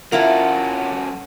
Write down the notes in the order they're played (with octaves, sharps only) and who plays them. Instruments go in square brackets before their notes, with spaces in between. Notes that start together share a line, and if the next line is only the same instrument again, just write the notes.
[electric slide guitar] F#3 C#4 A4 [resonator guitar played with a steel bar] E4 F4 A#4 [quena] F#5